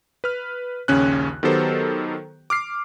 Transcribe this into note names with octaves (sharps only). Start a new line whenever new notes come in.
B4 F6
A#1 D#2 C#3 C#4 F#6
D#3 F#3 B3 G4 A4 C5
D6 F6 C7